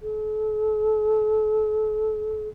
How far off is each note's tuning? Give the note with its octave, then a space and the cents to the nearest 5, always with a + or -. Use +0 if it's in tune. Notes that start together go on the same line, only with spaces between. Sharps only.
A4 -40